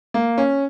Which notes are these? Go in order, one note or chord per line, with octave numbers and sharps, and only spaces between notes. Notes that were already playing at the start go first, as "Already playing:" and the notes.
A#3
C#4